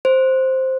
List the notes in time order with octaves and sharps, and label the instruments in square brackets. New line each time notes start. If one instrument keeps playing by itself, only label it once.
[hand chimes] C5